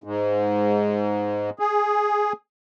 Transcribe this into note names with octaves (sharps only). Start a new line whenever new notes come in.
G#2
G#4